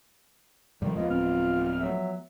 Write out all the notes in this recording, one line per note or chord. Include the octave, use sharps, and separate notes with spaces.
G2 C3 D#3 F3 G3 G#3
D#2 F3 G#3 B3 F4 D#5
D1 C4 F6
F#3 E5